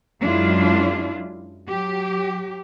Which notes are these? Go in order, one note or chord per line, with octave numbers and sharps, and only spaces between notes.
F#2 G#3 D4 E4 F4
F#3 G4